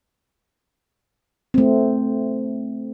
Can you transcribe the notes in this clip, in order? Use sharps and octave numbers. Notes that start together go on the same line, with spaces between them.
A3 C4